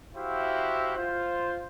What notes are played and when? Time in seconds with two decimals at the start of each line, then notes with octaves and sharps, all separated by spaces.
0.15 E4 F#4 G4 C5 E5 F5
0.97 F4 C5